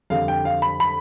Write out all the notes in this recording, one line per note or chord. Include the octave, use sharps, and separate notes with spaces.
F2 D3 G3 F5
G5
F5
B5
B5